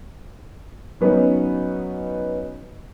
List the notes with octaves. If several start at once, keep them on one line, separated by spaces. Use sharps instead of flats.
F#3 B3 C#4 D#4